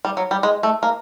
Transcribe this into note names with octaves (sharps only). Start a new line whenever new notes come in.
G3
F#3
G3
G#3
A3
A#3